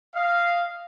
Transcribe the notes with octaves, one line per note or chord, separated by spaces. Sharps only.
D#5 F5